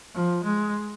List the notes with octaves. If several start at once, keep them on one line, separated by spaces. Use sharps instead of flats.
F3
G#3